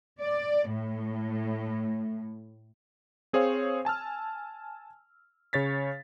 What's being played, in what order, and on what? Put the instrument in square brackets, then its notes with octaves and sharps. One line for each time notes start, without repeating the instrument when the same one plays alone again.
[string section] D5
A2
[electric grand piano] C4 G#4 C5 C#5 F5
G#5 A5 E6 F6
C#3 C#5 A6 B6